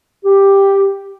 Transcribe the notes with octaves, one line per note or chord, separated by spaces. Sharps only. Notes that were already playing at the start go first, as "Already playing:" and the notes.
G4